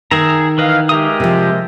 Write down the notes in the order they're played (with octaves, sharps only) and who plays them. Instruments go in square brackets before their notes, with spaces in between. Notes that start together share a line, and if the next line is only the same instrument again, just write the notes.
[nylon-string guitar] D#3 [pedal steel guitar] G#4 E5 A#5
[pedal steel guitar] E3 B4 D#5 [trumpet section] F5
[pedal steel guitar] G#3 A#4 D#6 [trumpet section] G4 E5
[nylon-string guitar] C3 F3